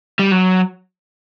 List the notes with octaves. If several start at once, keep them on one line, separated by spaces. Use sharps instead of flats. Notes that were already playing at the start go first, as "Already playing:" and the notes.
G3
F#3